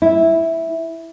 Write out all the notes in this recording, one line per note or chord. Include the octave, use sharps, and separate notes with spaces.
E4